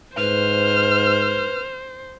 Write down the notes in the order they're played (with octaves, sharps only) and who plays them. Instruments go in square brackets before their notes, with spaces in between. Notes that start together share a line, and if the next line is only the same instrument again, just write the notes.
[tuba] G#2 [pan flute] B4 [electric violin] C5 [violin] F6